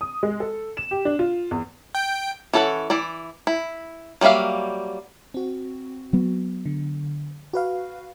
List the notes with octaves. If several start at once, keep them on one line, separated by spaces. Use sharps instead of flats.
D#6
G#3
A4
E7
G4
D4
F4
E2
G5
E3 C#4 A4 C#5 F#5
E3 E4 D5
E4
F#3 G3 A#3 E5 F5
C4 F#4
F#3 B3
D3
F#4 B4 F5